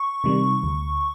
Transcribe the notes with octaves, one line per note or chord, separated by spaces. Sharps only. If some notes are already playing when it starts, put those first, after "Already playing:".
Already playing: C#6
C3 D#3 G3
D2